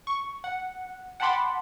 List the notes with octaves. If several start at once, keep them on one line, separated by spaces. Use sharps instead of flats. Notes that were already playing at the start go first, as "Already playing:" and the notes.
C#6
F#5
F#5 G5 A5 B5 C6 D6